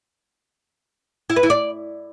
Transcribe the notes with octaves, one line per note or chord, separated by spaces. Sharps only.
E4
B4
E4
D5